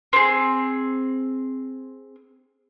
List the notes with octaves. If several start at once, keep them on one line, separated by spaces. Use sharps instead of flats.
C4 G#4